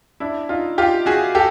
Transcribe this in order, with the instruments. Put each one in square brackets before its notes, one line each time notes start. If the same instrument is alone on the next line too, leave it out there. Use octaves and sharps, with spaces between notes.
[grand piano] D4 E4
D#4 F4
F4 G4
F#4 G#4
G4 A4